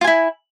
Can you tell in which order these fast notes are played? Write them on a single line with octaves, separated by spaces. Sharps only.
F4 G#5 E4